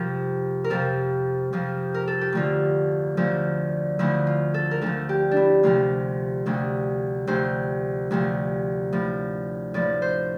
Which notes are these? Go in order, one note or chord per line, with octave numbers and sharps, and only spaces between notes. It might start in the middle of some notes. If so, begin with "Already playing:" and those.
Already playing: F2 C3 F3 A#4
A#4
F2 C3 F3 A4
F2 C3 F3
A#4
A4
G4
D2 D3 F3 F4
D2 D3 F3
D2 D3 F3 E4
F4
A4
A#4
D2 D3 F3 A4
G4
D4
E4
D2 C3 F3 F4
D2 C3 F3
D2 C3 F3 C5
D2 C3 F3
A2 F3
A2 F3 D5
C5